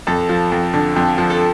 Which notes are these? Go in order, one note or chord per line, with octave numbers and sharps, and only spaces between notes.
F2 A4
F3
F2
D3
F2
F3
A4